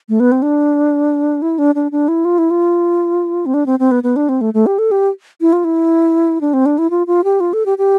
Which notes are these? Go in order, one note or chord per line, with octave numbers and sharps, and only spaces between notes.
A3
B3
C4
D4
E4
D4
D4
D4
E4
F4
E4
F4
C4
D4
C4
C4
B3
B3
D4
C4
A3
A3
G4
A4
G4
E4
F4
E4
D4
C4
D4
E4
F4
F4
G4
F4
A4
G4
G4